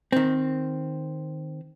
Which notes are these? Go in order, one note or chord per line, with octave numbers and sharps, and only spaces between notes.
D#3 C4